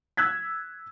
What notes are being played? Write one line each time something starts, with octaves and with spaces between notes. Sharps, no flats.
E6 F#6 G#6 B6